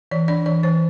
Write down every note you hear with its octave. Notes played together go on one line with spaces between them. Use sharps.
E3 D5
D4 D5
E3 D5
E3 C5